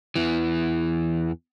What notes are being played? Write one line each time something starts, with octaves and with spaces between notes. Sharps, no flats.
E2 E3